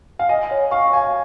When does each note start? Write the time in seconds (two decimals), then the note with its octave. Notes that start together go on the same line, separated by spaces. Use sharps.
0.19 F5
0.29 D#5 G#5
0.51 C#5
0.71 F5 C#6
0.93 F5 G#5